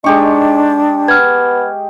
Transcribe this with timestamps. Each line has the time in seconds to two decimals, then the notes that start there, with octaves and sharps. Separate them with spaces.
0.04 G#3 D4 D#4 G4 C#6
1.08 B3 F6 G#6